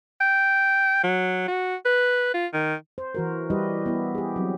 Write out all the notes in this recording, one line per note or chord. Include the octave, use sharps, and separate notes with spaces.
G5
F#3
F#4
B4
F4
D#3
C5
E3 F#4 A#4
G3 E4 G4 B4 D#5
B3 E4
G4 G#4
F#3 C4